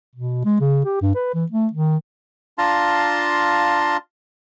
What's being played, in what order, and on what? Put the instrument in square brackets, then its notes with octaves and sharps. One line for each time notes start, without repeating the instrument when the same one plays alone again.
[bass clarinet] B2
G#3
C#3
G4
G2
B4
E3
A3
D#3
[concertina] D4 F4 F5 A5 A#5 C6